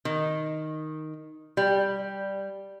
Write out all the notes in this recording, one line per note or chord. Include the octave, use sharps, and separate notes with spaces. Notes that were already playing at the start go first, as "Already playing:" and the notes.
D#3
G3